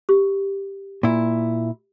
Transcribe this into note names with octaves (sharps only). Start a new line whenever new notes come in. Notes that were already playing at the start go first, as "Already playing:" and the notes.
G4
A#2 E4